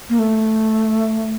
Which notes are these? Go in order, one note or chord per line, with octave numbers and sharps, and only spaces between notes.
A#3
A3